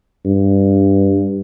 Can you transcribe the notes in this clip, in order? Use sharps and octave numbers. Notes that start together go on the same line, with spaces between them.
G2